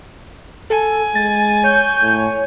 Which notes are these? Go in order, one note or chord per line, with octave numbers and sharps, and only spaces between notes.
A4 G#5
G#3 A6
C#5 G6
A2